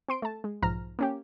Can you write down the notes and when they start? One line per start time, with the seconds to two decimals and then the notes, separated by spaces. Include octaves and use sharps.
0.08 C4 C6 D7
0.22 A3 A5
0.44 G#3
0.62 B1 G#2 F3 A#5 F6
0.99 A#3 C#4 G4